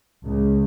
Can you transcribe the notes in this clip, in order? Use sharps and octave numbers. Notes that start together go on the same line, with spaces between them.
C#2